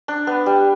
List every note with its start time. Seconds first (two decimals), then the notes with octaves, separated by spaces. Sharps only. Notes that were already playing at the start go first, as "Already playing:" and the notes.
0.08 D4
0.27 B3
0.46 G3